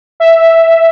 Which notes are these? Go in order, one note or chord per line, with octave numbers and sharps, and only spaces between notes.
E5